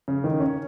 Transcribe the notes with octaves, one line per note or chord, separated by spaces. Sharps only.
C#3
D#3
C#4